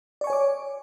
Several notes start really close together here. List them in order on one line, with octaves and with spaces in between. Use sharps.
D5 C#6 G#5 C#5 D6